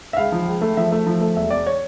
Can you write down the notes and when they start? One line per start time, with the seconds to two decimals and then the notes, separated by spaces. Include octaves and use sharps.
0.13 E5
0.17 C#2 F5
0.32 F3
0.48 C#2
0.61 A3
0.77 F3 E5
0.92 A3
1.07 F3
1.21 A3
1.36 E1 E5
1.50 E1 D5
1.67 C#5